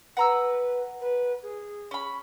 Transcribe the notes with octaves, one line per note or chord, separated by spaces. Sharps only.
B4 F#5 A#5 E6
B4
G#4
C#4 B5